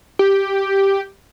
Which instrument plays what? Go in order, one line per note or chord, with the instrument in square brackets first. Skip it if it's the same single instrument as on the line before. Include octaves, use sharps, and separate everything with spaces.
[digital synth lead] G4